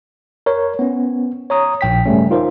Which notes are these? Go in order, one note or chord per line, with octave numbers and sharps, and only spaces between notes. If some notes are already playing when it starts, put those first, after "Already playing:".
A#4 C#5
B3 C#4
C#5 A#5 D#6
A#1 G5 B6
G2 C#3 G3 A3 C#4
D#4 F4 A#4 C5